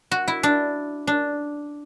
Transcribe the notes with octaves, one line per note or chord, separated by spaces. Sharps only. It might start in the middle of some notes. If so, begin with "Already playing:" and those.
F#4
E4
D4
D4